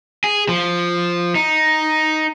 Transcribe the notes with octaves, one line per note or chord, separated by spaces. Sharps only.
G#4
F3
D#4